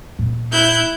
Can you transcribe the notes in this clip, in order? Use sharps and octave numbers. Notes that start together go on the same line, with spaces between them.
A#2
E4 F#6 G6